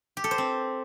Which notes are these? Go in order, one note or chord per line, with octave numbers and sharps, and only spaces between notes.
G4
A4
C5
C4